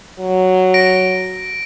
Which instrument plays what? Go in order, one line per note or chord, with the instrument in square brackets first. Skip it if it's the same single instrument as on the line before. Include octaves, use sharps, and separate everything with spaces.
[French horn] F#3
[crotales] A#6 D7